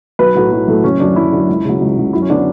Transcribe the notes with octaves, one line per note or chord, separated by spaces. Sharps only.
B1 B4
A2 F#3 A3
B1 E4
A2 F#3 A3
F#1 C#4
F#2 D3 D4
F#1 E4
F#2 D3
C#2
C#3 F#3
C#2
C#3 F#3
F#2 E4
C#4
D3 F#3 B3 D4